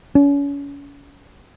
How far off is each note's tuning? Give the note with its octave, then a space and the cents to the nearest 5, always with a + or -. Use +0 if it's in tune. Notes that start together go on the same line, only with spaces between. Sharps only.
C#4 +35